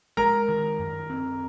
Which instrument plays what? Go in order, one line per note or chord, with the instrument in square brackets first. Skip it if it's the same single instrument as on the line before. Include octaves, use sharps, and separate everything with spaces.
[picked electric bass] G#3 [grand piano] A#4 A#5
[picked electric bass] D#3
F#2
C4